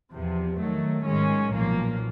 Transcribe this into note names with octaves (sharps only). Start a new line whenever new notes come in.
E2 C3 F3
D#3 F#3 A3
G#2 D#3 G#3 C#4
B1 A#2 F3 A#3